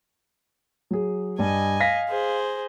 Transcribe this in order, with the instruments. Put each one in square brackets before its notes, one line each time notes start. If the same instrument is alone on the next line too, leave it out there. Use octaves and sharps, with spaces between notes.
[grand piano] F#3 G#4
[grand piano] G2 G3 [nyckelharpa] D#5 G#5
[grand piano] F5 A#6 B6
[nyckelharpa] G#4 C5